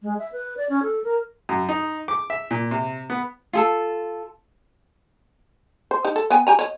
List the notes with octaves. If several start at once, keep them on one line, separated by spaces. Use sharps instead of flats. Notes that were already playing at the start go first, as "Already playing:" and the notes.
G#3
E5
B4
D5
C#4
A4
A#4
F#2
D#4
D6
E5
A#2
C3
B3
F4 G#4 A4
C5
D#4 G4
A4
B3 G5 G#5
G4 G#5 A#5
C#5 D#5